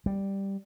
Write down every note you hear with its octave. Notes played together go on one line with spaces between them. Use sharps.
G3